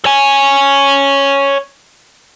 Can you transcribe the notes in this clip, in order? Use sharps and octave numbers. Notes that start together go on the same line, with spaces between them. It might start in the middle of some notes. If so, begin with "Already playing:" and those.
C#5 G#5